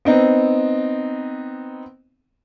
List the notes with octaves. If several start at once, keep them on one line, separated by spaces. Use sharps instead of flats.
B3 C4 D#4